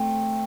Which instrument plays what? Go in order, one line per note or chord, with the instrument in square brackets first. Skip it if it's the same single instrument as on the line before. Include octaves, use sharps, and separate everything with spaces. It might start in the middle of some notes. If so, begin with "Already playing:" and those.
Already playing: [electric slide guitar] A3 [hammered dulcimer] C4